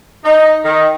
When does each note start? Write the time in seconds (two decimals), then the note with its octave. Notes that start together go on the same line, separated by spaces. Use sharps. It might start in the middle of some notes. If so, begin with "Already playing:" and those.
0.24 D#4
0.65 D#3